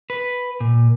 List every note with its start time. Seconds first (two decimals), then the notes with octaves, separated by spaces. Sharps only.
0.10 B4
0.60 A#2